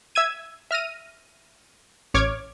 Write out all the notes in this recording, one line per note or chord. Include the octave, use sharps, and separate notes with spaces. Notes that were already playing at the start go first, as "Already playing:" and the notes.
E5 E6 G#6 D#7
E5 F6 A#6 D#7
A1 C#5 D6 F6 G#6